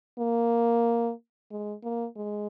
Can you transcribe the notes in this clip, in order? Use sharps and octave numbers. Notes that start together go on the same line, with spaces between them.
A#3
G#3
A#3
G#3